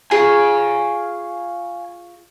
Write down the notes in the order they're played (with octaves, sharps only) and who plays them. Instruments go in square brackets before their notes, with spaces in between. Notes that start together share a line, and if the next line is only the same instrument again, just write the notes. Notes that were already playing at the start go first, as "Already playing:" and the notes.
[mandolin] F4 G#4 C#5 [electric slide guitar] F5 G#5